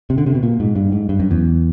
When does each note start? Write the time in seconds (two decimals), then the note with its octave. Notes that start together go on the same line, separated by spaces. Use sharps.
0.10 C3
0.18 D3
0.26 C3
0.35 B2
0.43 A#2
0.60 G#2
0.76 G2
0.92 G#2
1.09 G2
1.20 F#2
1.31 E2